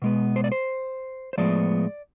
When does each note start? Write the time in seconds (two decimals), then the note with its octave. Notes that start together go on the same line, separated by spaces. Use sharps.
0.02 B2 G#3 B3
0.36 C5
0.44 D5
0.52 C5
1.33 C5
1.38 A2 F3 G#3 B3 D5